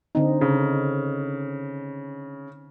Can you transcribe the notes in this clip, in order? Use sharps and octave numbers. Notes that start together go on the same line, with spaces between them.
D3 C4 D#4
C#3